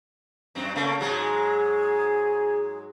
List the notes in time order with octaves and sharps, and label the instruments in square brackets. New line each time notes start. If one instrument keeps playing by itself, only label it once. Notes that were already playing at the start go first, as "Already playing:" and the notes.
[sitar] F#2 C4
C#3 A3 A#3
[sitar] G#2 F#3 G#3 [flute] G#4